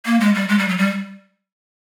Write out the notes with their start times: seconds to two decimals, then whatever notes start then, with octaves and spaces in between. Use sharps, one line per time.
0.06 A#3
0.20 G#3
0.34 G3
0.48 G#3
0.59 G3
0.68 F#3
0.78 G3